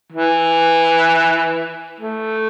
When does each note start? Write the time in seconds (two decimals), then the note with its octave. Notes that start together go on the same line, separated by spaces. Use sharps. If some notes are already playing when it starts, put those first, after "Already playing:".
0.12 E3
2.01 A3